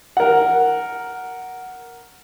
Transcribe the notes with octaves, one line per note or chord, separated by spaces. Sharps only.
A#4 F#5